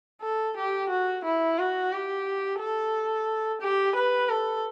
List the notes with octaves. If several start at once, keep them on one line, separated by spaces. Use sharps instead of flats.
A4
G4
F#4
E4
F#4
G4
A4
G4
B4
A4